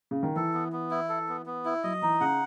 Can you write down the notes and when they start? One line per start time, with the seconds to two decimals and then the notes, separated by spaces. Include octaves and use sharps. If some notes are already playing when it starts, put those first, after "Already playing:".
0.11 C#3
0.23 D#3
0.36 E3 A4
0.54 B3
0.72 B3
0.91 E4
1.09 A4
1.28 B3
1.46 B3
1.65 E4
1.83 F#3 D#5
2.02 E3 D#4
2.21 C#3 F#5